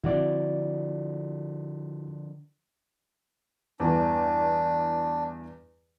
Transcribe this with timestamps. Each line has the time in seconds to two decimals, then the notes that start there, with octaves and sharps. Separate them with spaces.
0.04 D3 F3 C4 E4 F#4 D5
3.80 E2 G2 E3 D4